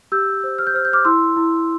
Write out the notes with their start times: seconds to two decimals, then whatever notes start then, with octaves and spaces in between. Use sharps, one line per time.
0.12 G4 E6 G6
0.44 C5
0.58 F6
0.67 G6
0.74 C5 F6
0.85 G6
0.93 D6 F6
1.05 E4 C6 E6
1.37 E4